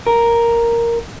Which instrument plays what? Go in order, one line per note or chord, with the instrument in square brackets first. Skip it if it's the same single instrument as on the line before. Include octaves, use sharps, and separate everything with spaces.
[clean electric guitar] A#4